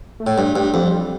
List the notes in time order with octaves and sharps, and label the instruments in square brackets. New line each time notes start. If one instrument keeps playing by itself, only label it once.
[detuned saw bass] A3
[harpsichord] A2
[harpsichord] G2 [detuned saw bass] G3
[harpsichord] G2
F2